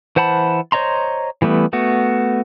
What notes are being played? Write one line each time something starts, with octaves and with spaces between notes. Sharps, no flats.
E3 C5 F#5 A5 B5
C5 C#5 D#5 A#5 C6
E3 G3 A3 B3
A3 B3 F#4